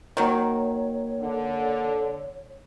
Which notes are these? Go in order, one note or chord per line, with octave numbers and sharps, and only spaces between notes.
D#3 F#3 A#3 A#4 C#5
D3